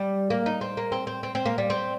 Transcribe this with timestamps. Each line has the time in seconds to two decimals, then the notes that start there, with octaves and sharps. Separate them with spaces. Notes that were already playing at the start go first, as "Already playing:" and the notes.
Already playing: G3
0.30 A#3
0.46 D#4
0.61 C4
0.77 A#3
0.92 C4
1.07 C4
1.23 C4
1.35 C4
1.46 A#3
1.58 G3
1.70 C4